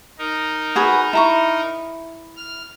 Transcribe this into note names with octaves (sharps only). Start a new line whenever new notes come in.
D#4 A#4
F#4 G#4 B4
E4 A#5 C#6
F6